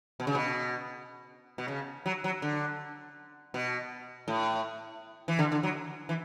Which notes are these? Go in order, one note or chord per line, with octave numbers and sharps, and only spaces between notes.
B2
C#3
B2
B2
C#3
F#3
F#3
D3
B2
A2
E3
D3
D3
F#3
E3